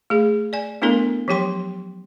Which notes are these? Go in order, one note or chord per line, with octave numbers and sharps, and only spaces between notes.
A3 G#4
D5 G#5
A3 B3 D4 E4 A4 A#4
F3 F#3 G4 G5 C6